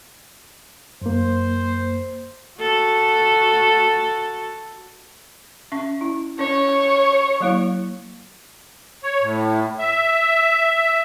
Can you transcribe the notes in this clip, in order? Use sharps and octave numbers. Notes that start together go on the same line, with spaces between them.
F#2 A#3 C5
F#4 A4
C#4 E5 C#6
E4 A#5
C#4 C#5
F#3 A#3 E4
C#5
A2
E5